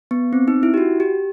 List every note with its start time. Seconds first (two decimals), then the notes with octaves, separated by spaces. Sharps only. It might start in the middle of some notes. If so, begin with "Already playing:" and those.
0.11 B3
0.33 C4
0.48 D#4
0.63 E4
0.74 G4
0.78 F#4
1.00 G4